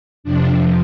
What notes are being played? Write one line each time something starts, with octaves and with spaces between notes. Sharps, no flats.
F2 C3 F3 D4